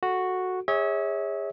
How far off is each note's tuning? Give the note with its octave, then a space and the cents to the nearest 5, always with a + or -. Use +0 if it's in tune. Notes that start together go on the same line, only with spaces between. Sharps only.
F#4 -5 A4 +0
G#4 -30 C#5 +0 E5 -35